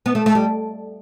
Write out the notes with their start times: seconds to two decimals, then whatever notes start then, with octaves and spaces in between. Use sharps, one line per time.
0.06 B3
0.15 A3
0.26 A3
0.35 G3